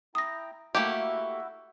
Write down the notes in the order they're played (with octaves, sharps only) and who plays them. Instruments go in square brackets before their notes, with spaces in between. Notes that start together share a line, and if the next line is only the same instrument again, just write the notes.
[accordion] E4 G5 A#5 [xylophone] D#6 A#6
[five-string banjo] A3 A#3 G4 [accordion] E4 F#4 E5